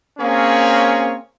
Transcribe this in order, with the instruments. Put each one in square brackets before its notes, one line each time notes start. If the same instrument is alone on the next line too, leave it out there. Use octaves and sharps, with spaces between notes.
[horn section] A#3 C4 C#4 G#4 C#5